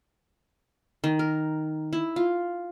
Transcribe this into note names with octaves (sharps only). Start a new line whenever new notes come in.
D#3
A#4
E4
F4